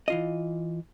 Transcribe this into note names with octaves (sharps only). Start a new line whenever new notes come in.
E3 F4 D#5